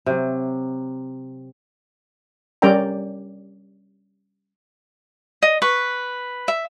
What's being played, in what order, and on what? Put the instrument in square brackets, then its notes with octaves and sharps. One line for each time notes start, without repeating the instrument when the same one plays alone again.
[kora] C3 F#3
[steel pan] G3 C#4 A#4 D5 G5 A#5
[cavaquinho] D#5
B4 C#6
E5